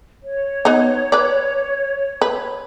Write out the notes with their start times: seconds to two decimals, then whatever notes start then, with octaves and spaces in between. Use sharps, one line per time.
0.23 C#5
0.65 B3 D#4
1.12 B4 D5
2.21 B4